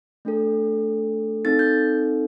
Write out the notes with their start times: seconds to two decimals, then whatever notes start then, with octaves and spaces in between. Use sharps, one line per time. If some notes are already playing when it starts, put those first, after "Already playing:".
0.25 A3 D4 A4
1.45 C4 D#4 A4 A6
1.59 G6